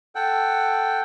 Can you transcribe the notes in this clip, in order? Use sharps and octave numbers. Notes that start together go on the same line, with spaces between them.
A4 F#5 G5